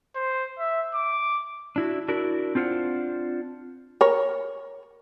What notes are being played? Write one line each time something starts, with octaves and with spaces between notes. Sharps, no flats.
C5
E5
D6
D4 E4 F#4
D4 E4 F#4 A#4
C4 D4 F4 C5 F#5
A#4 C#5